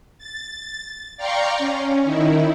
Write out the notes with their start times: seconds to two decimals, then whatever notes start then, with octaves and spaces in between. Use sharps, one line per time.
0.18 A6
1.17 D5 F5 G5 A#5 C6 C#6
1.58 C#4
2.04 D#3 D#4 E4